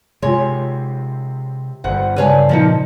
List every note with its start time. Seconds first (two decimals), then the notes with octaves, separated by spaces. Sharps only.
0.22 C3 G#3 F4 C#5 G#5 C6
1.84 G1 G3 C5 F#5
2.16 C#3 D4 B4 C#5 F5 G#5
2.49 A#2 F3 D#4 D#5 A5